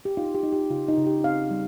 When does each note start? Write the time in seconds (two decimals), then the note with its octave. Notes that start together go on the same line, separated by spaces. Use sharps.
0.05 G4
0.17 D#4 F4
0.35 G4
0.43 D#4
0.53 G4
0.70 C#3 F4
0.88 D#4
0.97 C#3
1.07 G4
1.24 C4 F5
1.51 G3